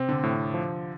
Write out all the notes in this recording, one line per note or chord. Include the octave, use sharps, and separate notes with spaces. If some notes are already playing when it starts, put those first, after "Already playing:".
Already playing: C3 C4
D3
A2
F3